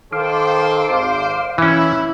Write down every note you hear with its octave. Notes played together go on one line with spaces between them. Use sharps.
D#3 A4 C5 F5 C6 D6
G#1 C5
E3 C#4 E4